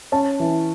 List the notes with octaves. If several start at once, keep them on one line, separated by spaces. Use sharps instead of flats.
C#4 A5
E3